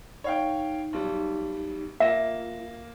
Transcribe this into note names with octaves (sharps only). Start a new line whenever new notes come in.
D#4 C#5 F5 G5
B1 G3
A#3 F4 E5 A#6 E7